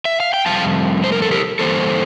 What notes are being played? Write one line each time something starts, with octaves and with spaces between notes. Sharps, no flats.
E5
F5
G5
F2 C3 G3 F5 A5
C5
A#4
A4
G4 A#4
G2 E3 A#3 A4 C5